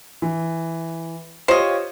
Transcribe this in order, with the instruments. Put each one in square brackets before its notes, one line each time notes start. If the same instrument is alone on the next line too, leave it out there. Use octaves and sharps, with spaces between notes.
[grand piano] E3
[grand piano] F4 G4 C#5 [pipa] C5 D#5